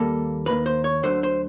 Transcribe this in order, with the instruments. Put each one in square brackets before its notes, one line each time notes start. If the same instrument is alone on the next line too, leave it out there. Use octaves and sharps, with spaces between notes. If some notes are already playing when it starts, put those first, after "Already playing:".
Already playing: [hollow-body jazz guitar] D#2 G3 A#3 A4
D#2 D#3 G3 A#3 B4
C5
C#5
D2 D3 F#3 A3 C5
C5